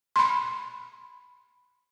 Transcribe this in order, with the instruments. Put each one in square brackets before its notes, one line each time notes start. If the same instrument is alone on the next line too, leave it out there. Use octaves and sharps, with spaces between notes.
[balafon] B5 C6